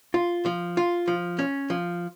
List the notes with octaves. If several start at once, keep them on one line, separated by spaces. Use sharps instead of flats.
F4
F3
F4
F3
C#4
F3